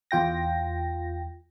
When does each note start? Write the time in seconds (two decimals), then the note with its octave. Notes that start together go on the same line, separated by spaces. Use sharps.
0.11 E2 F4 G5 A#6